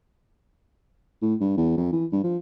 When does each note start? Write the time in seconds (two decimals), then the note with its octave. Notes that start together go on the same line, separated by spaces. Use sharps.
1.22 A2
1.40 G2
1.57 E2
1.77 F2
1.92 E3
2.12 G2
2.24 F3